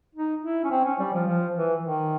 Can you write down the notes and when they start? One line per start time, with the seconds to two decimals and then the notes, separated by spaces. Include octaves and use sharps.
0.15 D#4
0.43 E4
0.64 C#4
0.71 C4
0.85 C#4
0.99 G3
1.13 F3
1.27 F3
1.55 E3
1.83 D#3